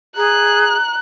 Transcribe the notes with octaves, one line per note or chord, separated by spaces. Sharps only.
G#4 A#5 F#6